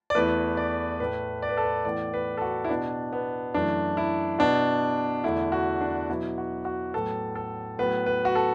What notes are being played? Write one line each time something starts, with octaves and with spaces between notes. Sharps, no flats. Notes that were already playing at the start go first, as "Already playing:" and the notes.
D5
E2 E3 A3 B4
D5
A2 A3 B4
D5
B4
A4
B4
A2 E3 B3 D5
B4
A4
F#4
E4
B2 B3 D4
B3
F#2 E3 A3 D4
E4
B2 B3 D4
E2 D3 A3 E4
F#4
D4
B2 F#3 B3 E4
F#4
F#4
A2 F#3 B3 A4
A4
A2 F#3 B3 B4
B4
F#4
A4